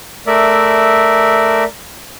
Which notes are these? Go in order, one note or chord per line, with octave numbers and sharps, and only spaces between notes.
A3 A#4 D5 E5